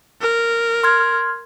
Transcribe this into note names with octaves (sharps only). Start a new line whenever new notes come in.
A#4
C6 F6 G#6